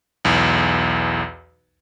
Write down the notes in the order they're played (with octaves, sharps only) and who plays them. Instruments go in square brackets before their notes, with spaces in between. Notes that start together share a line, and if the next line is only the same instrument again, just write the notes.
[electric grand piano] B1 E2